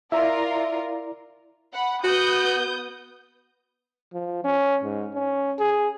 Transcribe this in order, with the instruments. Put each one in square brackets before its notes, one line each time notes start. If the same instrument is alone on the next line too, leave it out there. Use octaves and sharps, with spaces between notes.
[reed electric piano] E4 D5 A#5 [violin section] F4 A#4 [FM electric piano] E5
[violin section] F#5 B5
[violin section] B3 D#6 G6 [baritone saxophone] F#4
[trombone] F3
C#4
G#2
C#4
G#4